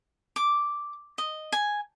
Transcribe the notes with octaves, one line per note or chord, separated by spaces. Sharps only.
D6
D#5
G#5